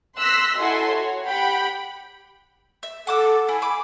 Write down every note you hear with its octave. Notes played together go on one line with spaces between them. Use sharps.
C6 E6 F#6 A#6 B6
E4 F#4 A4 D#5 G#5 C6
F#4 C#5
G4 F#5 G5 B5
E5
A4 F#5 D6 E6
E4 G#5
B5 D6